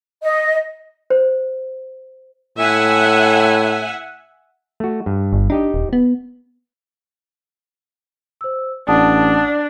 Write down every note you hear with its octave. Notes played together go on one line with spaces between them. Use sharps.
D#5
C5
A2 E5 F#5 G#5
A3 F#4
G2
G1
D4 D#4 G4 D#5
D#1
B3
C5 E6
A1 D4 F#5 A5 D#6